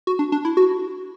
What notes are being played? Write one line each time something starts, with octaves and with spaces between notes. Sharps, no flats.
F#4
D4
D4
E4
F#4